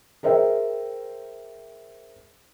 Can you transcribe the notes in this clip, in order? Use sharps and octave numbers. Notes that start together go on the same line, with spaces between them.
G#4 A#4 C5 E5 G5